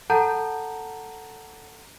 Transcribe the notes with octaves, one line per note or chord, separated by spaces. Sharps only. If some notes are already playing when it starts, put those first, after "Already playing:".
A4 F#5 A5 A#5 G6